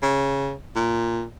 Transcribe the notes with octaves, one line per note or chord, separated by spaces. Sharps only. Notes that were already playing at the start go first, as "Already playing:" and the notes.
C#3
A#2